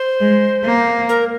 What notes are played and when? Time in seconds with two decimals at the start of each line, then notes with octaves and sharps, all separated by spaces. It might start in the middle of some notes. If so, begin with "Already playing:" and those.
Already playing: C5
0.21 G#3
0.65 A#3
1.09 A#4